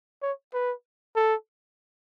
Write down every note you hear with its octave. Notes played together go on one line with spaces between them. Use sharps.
C#5
B4
A4